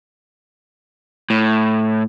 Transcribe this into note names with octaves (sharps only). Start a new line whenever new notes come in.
A2